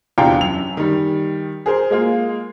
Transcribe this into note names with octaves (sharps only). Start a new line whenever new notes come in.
E2 C3 D4 F4 G5 A#5
F#2 F7
D#3 G3
G#4 A#4 C5
G#3 A#3 F4